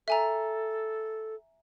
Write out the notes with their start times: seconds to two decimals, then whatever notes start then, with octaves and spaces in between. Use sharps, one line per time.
0.08 A4 E5 G#5 A#5